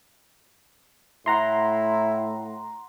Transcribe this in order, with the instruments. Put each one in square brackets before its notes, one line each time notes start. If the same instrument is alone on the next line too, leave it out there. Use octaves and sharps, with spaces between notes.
[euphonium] A2 [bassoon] E4 [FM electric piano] F#5 A#5 C6